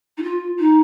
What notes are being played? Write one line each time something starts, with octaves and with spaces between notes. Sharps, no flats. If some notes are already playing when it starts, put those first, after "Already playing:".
D#4
F4
D#4